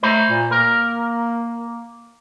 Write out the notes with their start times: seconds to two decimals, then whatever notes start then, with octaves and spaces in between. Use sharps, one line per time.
0.03 A3 C5 A#5 B5
0.30 A#2
0.51 A#3 A#4